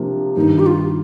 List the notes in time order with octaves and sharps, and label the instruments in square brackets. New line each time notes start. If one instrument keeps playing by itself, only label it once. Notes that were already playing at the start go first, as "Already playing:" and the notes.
Already playing: [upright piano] C3 F3 A#3 D4
[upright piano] G2 D#3 A#3 [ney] D#4
[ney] G4
F4